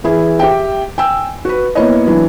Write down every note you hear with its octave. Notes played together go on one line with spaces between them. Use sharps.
E3 E4 G#4
G4 E5 G5
G5 G#5 E6
F#4 B4
A#3 B3 E4 C#5 D#5
E3 F#3 D4 E4